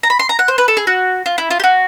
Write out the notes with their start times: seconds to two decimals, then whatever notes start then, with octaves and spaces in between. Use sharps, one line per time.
0.03 A#5
0.10 B5
0.19 C6
0.29 A#5
0.39 F#5
0.48 C5
0.58 B4
0.68 A4
0.77 G#4
0.87 F#4
1.26 F4
1.38 E4
1.51 F4
1.60 G4
1.64 F#4